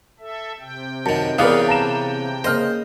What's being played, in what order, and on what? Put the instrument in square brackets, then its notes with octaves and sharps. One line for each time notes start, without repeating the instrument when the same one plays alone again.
[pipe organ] A4 E5
C3 G5
[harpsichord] F#2 D#3 [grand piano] A5
[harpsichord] C#3 E3 B3 [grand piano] A#4 D#6 [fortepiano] B4 D5 F5
[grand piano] A5 A#5 E7
[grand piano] C#3 A#3 F6 [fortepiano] C5 [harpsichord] D#5